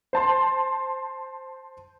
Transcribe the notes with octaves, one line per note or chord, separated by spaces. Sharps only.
C5 A5 C6